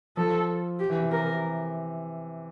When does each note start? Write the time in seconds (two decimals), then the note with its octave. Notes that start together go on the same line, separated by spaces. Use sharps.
0.17 F3 A4
0.79 G4
0.90 E3
1.00 C3
1.11 C3 A#4